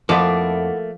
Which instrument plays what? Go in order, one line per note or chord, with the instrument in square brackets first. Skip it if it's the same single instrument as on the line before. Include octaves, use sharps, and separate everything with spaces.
[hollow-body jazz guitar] F2 [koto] F3 [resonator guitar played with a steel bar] A3 A#3 [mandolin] E4 F#4 D6